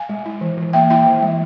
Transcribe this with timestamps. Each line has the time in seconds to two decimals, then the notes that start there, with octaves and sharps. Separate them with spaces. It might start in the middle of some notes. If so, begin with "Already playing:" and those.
Already playing: F5 G#5
0.09 G#3
0.26 E4
0.41 E3
0.57 E3
0.73 A#3 E5 G5
0.90 E4 E5 G5
1.06 E3
1.22 G#3